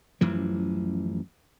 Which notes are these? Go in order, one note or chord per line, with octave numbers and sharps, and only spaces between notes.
A1 F#2 E3 F3